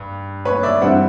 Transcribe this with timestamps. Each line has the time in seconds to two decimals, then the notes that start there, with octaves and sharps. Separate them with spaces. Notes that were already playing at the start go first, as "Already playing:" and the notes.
Already playing: G2
0.45 B4 C#5
0.63 D5 E5
0.81 G2 E3 G3 C4 E5 F#5